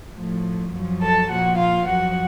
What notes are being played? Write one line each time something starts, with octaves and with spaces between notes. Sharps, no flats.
A2 F3
F#2 F3
A4 A5
A#2 F3 F#4 F#5
F4 F5
F#2 F3 F#4 F#5